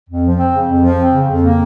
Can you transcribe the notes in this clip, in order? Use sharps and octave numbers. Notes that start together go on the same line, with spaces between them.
F2
F3
C4
C#3
F2
F3
C4
C#3
F2
A#3